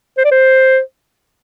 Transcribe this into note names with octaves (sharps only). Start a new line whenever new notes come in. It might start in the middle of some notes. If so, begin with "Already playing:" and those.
C5
D5
C5